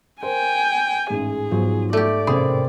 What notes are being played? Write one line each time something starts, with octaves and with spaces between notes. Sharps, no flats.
A#4 C5 G5 G#5
A1 G#2 G#4
G#2 F3 F#3 B3
A3 G4 D5
A1 C3 A3 A#3 C4 G#4 B5